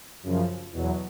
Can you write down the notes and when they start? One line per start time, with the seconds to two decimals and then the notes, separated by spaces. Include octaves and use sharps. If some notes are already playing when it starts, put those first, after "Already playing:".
0.23 F#2 C#3 F3
0.72 E2 B2 F#3